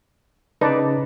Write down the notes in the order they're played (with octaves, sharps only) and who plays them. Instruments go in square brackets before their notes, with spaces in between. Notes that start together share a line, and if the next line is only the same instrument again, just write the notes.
[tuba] C#3 [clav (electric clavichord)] D#4 [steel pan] B4 D5 A5